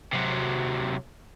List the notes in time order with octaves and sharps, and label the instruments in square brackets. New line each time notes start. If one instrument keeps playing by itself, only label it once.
[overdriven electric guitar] C3 F#3